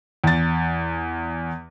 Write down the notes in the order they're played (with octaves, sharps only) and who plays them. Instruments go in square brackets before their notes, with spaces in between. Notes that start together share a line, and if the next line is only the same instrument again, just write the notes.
[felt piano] E2 A6